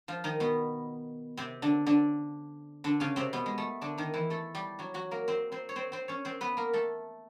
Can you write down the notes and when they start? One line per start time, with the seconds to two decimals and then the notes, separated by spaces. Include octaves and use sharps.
0.08 F3 F4
0.24 D#3 D#4
0.40 B2 B3
1.37 C3 C4
1.62 D3 D4
1.86 D3 D4
2.84 D3 D4
3.00 C#3 C#4
3.16 C3 C4
3.33 B2 B3
3.46 G#3
3.58 A3
3.81 D3 D4
3.98 D#3 D#4
4.14 E3 E4
4.30 A3 A4
4.55 G3 G4
4.79 F#3 F#4
4.94 F#3 F#4
5.11 A#3 A#4
5.28 C4 C5
5.52 C4 C5
5.69 C#5
5.76 C4 C5
5.92 C4 C5
6.08 C#4 C#5
6.25 C4 C5
6.41 B3 B4
6.57 A#3 A#4
6.73 A3 A4